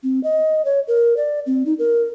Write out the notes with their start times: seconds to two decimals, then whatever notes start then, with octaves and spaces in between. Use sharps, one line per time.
0.03 C4
0.24 D#5
0.65 C#5
0.88 A#4
1.17 D5
1.46 C4
1.66 D#4
1.79 A#4